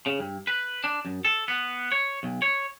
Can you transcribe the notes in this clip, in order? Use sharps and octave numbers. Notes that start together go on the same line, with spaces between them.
C#3
G2
B4
D4
F#2
A4
B3
C#5
B1
C#5